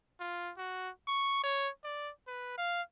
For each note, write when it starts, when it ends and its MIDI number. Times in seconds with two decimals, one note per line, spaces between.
0.20 0.53 65
0.57 0.90 66
1.08 1.43 85
1.43 1.70 73
1.84 2.11 74
2.27 2.56 71
2.58 2.82 77